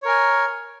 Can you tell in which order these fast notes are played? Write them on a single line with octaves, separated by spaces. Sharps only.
C#5 A#4 G#5